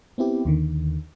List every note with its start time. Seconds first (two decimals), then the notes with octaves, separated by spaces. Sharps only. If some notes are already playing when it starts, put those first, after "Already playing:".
0.18 B3 C4 E4 G4
0.45 D#2 D3 D#3